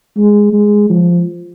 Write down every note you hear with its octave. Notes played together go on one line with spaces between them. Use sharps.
G#3
G#3
F3